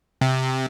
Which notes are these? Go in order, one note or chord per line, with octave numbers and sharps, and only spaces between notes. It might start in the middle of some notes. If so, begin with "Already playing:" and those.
C3